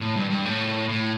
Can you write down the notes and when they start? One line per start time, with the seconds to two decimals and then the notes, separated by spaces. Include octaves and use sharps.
0.01 A2
0.16 G2
0.30 G2
0.45 A2
0.89 A2